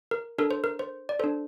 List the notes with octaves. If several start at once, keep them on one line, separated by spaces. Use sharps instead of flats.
A#4
D4 A4 A#4
C5
A#4
C5
D5
D4 A4 C5